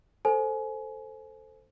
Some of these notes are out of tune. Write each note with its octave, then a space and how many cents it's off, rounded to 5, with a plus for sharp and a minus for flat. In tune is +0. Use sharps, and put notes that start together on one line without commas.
A4 +5 C5 +0 G#5 +30